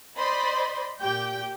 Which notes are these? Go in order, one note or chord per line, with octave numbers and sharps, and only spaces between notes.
C5 D5 D#5 B5 C6
A#2 G4 G5 G6